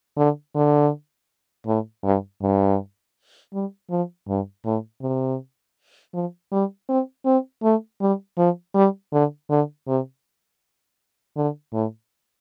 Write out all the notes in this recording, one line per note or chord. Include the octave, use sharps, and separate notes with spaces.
D3
D3
A2
G2
G2
G3
F3
G2
A2
C3
F3
G3
C4
C4
A3
G3
F3
G3
D3
D3
C3
D3
A2